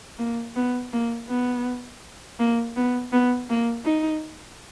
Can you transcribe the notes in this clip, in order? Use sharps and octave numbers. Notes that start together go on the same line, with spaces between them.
A#3
B3
A#3
B3
A#3
B3
B3
A#3
D#4